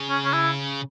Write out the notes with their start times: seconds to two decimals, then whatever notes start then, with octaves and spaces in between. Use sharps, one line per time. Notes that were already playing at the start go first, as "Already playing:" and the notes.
Already playing: C#3
0.10 C#4
0.25 C#4
0.33 E4